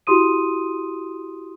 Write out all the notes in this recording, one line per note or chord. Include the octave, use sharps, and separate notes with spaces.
E4 F#4 G4 C6 D#6 D#7